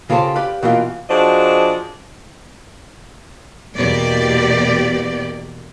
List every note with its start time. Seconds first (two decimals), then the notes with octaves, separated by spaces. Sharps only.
0.10 C#3 F4 G4 A4 C5
0.35 G4 B4 D5 F5
0.63 B2 E3 A#3 F4
1.09 F3 D4 F#4 G#4 C5 D#5
3.76 E2 B2 A#3 G4 D5